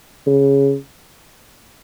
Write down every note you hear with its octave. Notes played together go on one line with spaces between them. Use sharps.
C#3